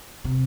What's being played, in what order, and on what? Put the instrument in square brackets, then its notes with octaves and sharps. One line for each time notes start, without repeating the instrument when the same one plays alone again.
[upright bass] C3